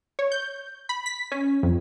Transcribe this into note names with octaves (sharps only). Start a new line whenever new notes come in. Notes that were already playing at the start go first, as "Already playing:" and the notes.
C#5
G6
B5
B6
C#4
F2